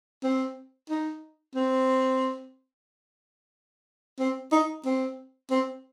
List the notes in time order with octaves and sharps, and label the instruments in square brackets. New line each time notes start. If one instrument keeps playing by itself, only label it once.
[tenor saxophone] C4
D#4
C4
C4
D#4
C4
C4